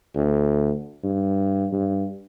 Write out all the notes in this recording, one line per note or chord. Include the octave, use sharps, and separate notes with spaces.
D2
G2
G2